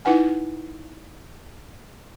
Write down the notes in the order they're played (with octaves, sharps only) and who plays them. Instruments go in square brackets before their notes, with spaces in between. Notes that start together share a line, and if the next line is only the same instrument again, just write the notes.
[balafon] D#4 E4 B4 F#5 G#5